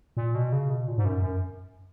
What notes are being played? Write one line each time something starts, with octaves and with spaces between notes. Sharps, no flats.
A#2
B2
C#3
B2
A#2
G#2
F#2
F#2